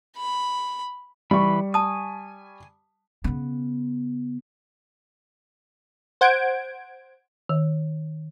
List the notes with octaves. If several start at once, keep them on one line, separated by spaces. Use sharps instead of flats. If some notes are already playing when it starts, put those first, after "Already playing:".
B5
E3 G3 B5 C#6
G#5 A5 D#6
C#3 B3
C5 F#5 G6 G#6 D7
D#3